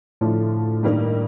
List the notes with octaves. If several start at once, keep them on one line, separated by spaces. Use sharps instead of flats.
A2 D3 F3 A3
G2 D#3 G3 A#3 D#4